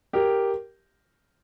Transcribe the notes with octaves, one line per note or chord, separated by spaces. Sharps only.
G4 A#4